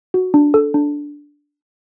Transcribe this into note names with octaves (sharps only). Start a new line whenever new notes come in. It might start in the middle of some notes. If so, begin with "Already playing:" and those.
F#4
D4
A4
D4